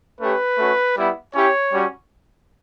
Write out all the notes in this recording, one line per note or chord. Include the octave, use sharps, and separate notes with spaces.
A3 C#4 G4 B4
A3 C#4 F#4
G3 B3 E4
C#4 E4 G4 C#5
G3 C#4 F#4